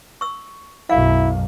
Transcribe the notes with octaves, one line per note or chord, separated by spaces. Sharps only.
C#6 E6
B1 F#2 E4 F5